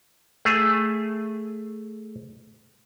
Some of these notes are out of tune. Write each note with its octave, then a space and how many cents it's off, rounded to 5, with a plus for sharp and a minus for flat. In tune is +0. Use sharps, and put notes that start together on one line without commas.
A3 +0 G#4 +0